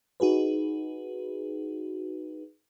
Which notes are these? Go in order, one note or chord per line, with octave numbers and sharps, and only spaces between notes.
D#4 F#4 G#4 B4